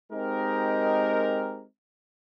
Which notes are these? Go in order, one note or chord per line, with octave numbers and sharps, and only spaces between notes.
G#3 C4 D#4 G4 A#4